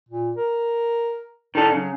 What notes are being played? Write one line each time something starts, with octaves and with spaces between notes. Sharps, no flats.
A#2
A#4
A2 D#3 A4
C#3 F#3